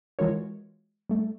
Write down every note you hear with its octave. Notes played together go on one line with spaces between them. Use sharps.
E3 G#3 F4 F#4 A#4 C#5
G3 A3